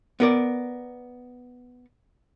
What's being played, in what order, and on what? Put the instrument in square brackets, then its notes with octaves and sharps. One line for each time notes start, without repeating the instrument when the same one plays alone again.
[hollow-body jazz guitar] B3 A#4 D5